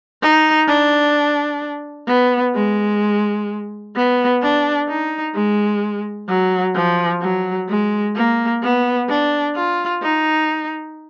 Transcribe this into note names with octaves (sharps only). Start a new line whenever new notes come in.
D#4
D4
B3
G#3
B3
D4
D#4
G#3
F#3
F3
F#3
G#3
A#3
B3
D4
F4
D#4